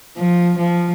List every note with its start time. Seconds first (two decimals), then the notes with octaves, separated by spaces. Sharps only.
0.18 F3
0.58 F3